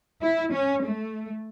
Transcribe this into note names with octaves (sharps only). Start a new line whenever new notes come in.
E4
C#4
A3